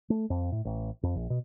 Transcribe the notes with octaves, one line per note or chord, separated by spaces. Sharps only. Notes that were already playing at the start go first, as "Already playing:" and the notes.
A3
F2
A2
A1
F2
A#1
B2